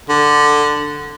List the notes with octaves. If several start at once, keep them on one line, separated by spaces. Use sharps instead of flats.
D3